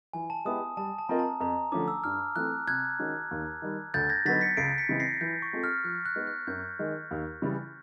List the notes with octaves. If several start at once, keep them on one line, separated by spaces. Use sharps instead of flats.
E3 G#5
A5
G#3 B3 E4 G4 D#6
G3 A5
A5
C4 F4 A#4 D#5 A#5
A5
F2 A#5
D3 F3 A3 C#4 D6
E6
G2 F6
E3 A3 C4 F#6
C3 F#6 G#6
D#3 G#3 C#4 F#4
D#2
D#3 G3
D2 G6 A6
G#6 A#6
D3 F#3 B3 D#4 A6 B6
B6 C#7
C#2 C7 D7
B6 C#7
C#3 E3 G#3 C4
A#6 C7
E3 G6
C#6
G#3 C4 F4 A4
F6
F3 F#6
F#6
G#3 B3 D#4
F#6
F#2 G6
D#3 G#3
D#2
C#3 E3 G3